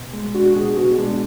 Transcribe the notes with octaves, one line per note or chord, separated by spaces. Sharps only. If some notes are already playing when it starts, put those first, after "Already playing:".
Already playing: B2
G#3
D4 F#4
B2 G#4
B2 F#4
B3
G#3 D4